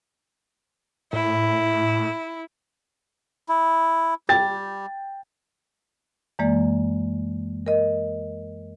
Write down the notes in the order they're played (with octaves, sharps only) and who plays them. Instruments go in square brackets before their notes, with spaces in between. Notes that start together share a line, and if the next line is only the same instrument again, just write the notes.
[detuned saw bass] A2 [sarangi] E4
[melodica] E4
[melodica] G3 [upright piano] G5 A6
[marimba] F#2 E3 G#3 A#3 D5
A#4 D#5